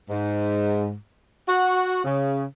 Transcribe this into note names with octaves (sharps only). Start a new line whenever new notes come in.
G#2
F#4
C#3